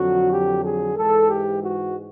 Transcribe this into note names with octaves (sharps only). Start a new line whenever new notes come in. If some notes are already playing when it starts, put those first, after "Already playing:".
Already playing: F2 D3 F#3 F#4
G4
G#4
G#2 E3 G#3 A4
G4
F#4